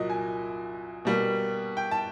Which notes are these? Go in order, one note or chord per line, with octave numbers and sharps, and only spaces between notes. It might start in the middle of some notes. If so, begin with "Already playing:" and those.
Already playing: C2 A#2 F#3 D#5
G#5
B2 G3 A#3
G5
A5